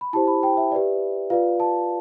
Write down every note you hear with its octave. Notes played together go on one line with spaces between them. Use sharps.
B5
E4 G4 C5 A5
B5
G5
E5
G4 B4 D5
F4 B4 D5 F5
A5